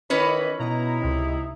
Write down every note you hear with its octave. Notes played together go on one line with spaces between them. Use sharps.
D#3 E3 C#4 B4 C#5 D#5 B5
B2 D#4 E4 A#5
C#2 C3